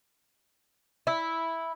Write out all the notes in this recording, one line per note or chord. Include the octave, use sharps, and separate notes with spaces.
E4